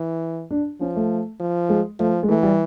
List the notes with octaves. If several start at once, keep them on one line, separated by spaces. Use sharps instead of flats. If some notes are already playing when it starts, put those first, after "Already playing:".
Already playing: E3
D4
F3 C#4
A3
F3
G#3
F3 A3
G#3
E3 A3
G3